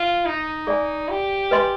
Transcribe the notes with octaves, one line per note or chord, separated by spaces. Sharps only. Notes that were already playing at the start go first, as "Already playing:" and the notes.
Already playing: F4
D#4
G#4 D5 G#5
G4
B4 D#5 G#5 C6